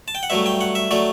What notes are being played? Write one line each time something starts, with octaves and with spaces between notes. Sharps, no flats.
A5
G5
F#5
G2 F#3 A3 E5
G5
F#5
E5
F#3 A3 D5